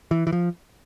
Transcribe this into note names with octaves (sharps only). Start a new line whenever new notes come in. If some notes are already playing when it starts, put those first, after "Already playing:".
E3
E3
F3